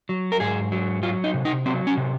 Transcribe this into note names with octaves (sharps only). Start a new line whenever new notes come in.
F#3
A#4
G#2 G#4
F#3
F#3 F4
D#4
C3
D#4
F#3 C4
C#4
C3